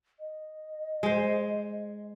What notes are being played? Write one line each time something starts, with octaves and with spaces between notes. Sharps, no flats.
D#5
G#3 C5